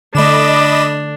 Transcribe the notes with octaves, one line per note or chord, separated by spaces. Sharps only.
D3 A3 D4 D#5 B5 D6 E7